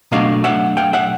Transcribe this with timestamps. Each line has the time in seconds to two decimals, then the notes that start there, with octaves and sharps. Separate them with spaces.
0.12 B2 F#3 A3 D4 D#5 F5
0.44 E5 F#5
0.77 F5 G5
0.93 E5 F#5